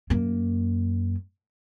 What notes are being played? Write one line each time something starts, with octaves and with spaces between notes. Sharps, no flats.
F#2 A#3